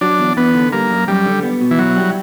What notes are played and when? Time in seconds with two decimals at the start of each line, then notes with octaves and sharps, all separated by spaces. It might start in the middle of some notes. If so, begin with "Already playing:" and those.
0.01 F#3 D4
0.19 E2
0.37 E2 B3
0.54 D3
0.72 G3 A#3
0.90 F#2
1.08 F#2 G3
1.26 D3
1.43 B3
1.61 B2
1.71 E3
1.79 F#3 E4
1.96 G3